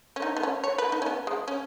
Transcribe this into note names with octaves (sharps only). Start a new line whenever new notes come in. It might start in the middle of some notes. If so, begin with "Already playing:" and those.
C#4
D#4
B3
C#4
C#5
B4
D#4
C#4
B3
G#3
C#4